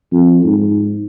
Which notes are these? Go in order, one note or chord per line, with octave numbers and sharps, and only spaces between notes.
F2
G#2